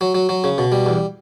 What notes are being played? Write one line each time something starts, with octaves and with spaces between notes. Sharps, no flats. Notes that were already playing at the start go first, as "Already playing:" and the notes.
F#3
F#3
F#3
C#3
B2
G3
E2